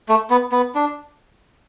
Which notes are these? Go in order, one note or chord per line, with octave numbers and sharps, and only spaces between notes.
A3
B3
B3
D4